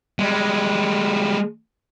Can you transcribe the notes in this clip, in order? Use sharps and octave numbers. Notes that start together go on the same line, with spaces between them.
G3 G#3